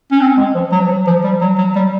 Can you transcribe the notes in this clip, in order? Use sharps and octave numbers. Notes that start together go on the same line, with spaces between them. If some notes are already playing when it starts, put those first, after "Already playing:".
C#4
C4
G#3
F3
F#3
F3
F#3
F3
G3
F#3
F#3
G3